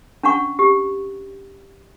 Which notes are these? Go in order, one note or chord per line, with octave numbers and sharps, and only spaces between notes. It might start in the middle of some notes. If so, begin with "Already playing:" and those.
C#4 D4 F#5 C#6
G4